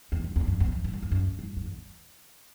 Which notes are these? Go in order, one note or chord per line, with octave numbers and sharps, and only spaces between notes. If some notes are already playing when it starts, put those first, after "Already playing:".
E2
F#2
E2
F#2
E2
F#2
G2
F#2
E2
F#2
G2
F#2
E2